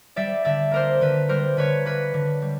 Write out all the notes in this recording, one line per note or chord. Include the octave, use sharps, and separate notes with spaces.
G3 D5 E5
D3 D5 E5
A#3 A#4 C5
D3 B4
G3 A#4 C5
D3 B4 C#5
A#3 B4
D3
G3